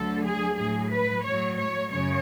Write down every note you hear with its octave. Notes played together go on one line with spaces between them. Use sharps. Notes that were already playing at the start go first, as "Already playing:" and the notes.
Already playing: D2 D3 F#3 A4
G#4
A2 F#3 G#4
B4
A2 F#3 C#5
C#5
F#2 C#3 C#5